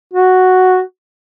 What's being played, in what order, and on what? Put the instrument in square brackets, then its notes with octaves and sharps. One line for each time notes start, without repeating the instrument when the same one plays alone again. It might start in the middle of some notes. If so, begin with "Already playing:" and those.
[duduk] F#4